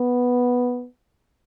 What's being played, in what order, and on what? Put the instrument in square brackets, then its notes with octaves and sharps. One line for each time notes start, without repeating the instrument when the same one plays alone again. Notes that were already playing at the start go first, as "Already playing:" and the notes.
Already playing: [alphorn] B3